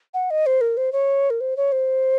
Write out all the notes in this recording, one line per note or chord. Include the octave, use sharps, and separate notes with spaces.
F#5
D#5
C5
A#4
C5
C#5
A#4
C5
C#5
C5